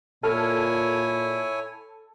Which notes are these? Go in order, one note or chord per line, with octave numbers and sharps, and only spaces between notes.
A#2 E4 A4 C#5 G#5 F6